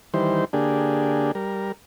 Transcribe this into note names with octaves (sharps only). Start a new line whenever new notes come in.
D#3 E3 G3 C5
D3 A#3 D4 G4 G#4
G3 A#4